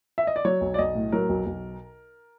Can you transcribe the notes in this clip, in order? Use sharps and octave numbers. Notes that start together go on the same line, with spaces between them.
E5
D#5
D5
F#3 C#5
B1
D5
B1 D#5
A2
F#3 A#4
B1
B1